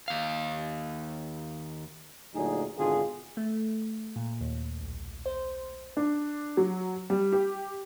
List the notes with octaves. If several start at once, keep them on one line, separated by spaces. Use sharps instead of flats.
D#2 F5
D2 A#2 F#3 D#4 G#4
G#1 B2 D3 D4 F4 G#4
A3
A#2
D#2
B1
C5
D4
F#3
G3
G4